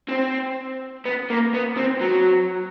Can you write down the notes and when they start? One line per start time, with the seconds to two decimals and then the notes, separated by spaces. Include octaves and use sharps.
0.09 C4
1.06 B3
1.30 A#3
1.54 B3
1.77 C4
2.01 F#3